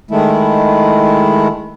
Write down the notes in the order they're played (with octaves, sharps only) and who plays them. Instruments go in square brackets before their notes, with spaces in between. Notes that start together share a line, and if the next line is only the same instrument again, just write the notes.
[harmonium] D#3 G#3 A3 E4